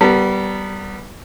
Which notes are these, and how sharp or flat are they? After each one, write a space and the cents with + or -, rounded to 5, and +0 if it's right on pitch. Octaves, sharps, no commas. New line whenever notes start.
G3 -15 B3 +0 A#4 -40